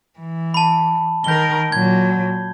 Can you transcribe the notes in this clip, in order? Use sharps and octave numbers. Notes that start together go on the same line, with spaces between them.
E3
A5 B5
D#3 A#4 G6 G7
A#2 F#3 G#6